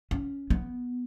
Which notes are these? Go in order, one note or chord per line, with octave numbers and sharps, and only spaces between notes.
C#4
B3